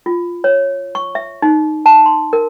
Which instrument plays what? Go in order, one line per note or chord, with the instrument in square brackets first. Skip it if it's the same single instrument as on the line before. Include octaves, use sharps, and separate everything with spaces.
[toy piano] F4
C#5
C#6
E5
D#4
A5
C6
A#4